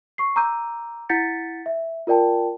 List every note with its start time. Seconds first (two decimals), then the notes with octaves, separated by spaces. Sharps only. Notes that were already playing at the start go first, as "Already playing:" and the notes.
0.18 C#6 C7
0.36 A#5 D6 E6 G6 D#7
1.09 E4 F#5 G6 A6 B6 C#7
1.66 E5
2.07 F4 A#4 D5 G5 A5